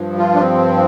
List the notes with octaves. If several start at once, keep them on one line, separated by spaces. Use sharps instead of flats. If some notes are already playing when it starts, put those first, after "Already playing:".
Already playing: G2 F3
F4
D4
C4